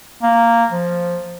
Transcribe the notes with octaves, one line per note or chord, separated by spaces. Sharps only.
A#3
F3